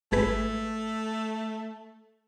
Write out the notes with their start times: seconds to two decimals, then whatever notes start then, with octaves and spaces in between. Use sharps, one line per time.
0.12 G#1 A3 G#4 B4